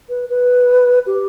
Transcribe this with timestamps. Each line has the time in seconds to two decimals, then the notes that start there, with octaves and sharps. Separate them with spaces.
0.09 B4
0.29 B4
1.06 G4